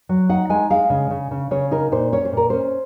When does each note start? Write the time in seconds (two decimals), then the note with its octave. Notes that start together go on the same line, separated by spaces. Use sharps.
0.09 F#3
0.29 D#4 F#5
0.50 G#3 G#5
0.70 G#3 F5
0.90 C#3
1.11 C#3
1.31 C#3
1.51 C#3 C#5
1.71 D#4 A#4
1.92 A#2 C5
2.12 C#4 C#5
2.25 C5
2.33 A#2 A#4
2.50 C#4 C5